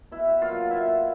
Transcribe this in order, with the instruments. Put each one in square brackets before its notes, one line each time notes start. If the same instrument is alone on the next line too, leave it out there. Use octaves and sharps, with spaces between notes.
[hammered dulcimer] B2 E4 E5
F#3 A#3 F4 F5
B2 E4 E5